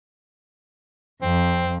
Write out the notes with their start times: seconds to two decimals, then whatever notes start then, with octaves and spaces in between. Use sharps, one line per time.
1.22 F2 C4